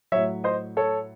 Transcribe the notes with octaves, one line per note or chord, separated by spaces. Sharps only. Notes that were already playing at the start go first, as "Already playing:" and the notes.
A2 F#3 C#5 E5
C5 D#5
A4 C#5